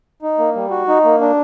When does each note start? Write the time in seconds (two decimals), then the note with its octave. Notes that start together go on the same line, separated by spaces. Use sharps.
0.22 D#4
0.38 A#3
0.55 G3
0.71 F#4
0.88 D#4
1.04 A#3
1.21 D4